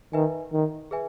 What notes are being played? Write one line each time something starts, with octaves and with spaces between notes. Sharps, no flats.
D#3 B4 E5 G#5
D#3
G#4 B4 E5 G#5